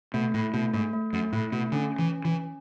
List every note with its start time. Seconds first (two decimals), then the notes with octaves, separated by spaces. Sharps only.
0.14 B2 A3
0.34 A2 E4
0.54 B2 A3
0.73 G#2 A3
0.93 A3
1.13 F#2 A3
1.33 A2 E4
1.52 B2 A3
1.72 D3 C#4
1.92 C#4
1.99 E3
2.11 C#4
2.25 E3
2.31 C#4